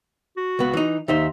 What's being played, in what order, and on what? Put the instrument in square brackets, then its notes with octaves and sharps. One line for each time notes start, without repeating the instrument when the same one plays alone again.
[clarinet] F#4
[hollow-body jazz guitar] C#2 B3
E3 D#4
[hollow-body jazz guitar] D#2 D#4 C5 [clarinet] E5